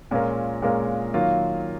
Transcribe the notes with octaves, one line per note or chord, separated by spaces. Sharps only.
A#2 G#3 C#4 F4 A#4
A#2 G#3 C#4 F4 A#4
D#3 F#3 A#3 F4